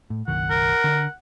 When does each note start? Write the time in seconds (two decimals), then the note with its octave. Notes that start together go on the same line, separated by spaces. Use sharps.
0.10 A2
0.28 F#1 B1 D#3 F#5
0.50 A#4
0.84 D3 D4